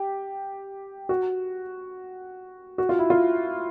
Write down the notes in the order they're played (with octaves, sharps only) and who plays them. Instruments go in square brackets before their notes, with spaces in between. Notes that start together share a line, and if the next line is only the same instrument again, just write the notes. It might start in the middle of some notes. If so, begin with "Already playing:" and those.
Already playing: [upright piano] G4
F#4
F#4
F4
E4
F4